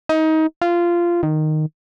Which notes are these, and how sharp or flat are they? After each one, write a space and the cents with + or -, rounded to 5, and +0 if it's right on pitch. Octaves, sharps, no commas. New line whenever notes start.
D#4 +25
F4 -15
D#3 -10